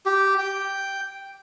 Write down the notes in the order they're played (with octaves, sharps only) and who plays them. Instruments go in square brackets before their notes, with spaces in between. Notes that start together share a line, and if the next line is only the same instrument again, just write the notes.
[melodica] G4
G5